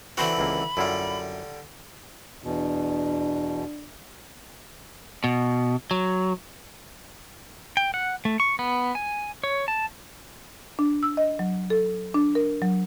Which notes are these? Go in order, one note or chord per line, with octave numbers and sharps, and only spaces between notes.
D3 E3 C4 F#4 C5 B5
C#2 A#3
F#2 D3 G3 E4 F4
E2 B2 D4
B2
F#3
G5
F#5
A3
C#6
B3
G#5
C#5
A5
D4
E6
D#5
F#3
A4
D4
A#4
F#3